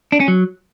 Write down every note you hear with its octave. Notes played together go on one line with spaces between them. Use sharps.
D4
C#4
F#3